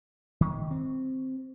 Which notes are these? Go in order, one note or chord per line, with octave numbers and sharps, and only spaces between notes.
D#3
C4